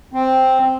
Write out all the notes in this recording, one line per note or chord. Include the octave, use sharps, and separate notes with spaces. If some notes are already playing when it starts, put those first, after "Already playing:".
C4